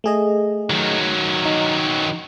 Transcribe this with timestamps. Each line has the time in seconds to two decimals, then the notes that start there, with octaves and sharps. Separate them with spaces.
0.04 A3 G#4 D#5
0.70 D#3 F#3
1.45 D#4